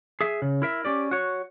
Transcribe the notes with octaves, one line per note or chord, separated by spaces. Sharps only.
G#4 E5
C#3
E4 A#4 E5
C#4 G4 D5
F#4 C#5